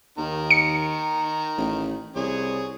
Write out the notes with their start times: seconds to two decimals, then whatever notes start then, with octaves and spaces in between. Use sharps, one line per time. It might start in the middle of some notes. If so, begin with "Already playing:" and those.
0.18 D#2 D#3 A#5
0.51 C#7
1.57 A1
2.16 C2 G#4 C#5